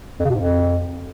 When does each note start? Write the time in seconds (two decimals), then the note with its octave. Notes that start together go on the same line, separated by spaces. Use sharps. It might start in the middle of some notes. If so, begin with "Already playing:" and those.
0.20 F2
0.25 C#3
0.30 B2
0.35 G#2
0.40 F2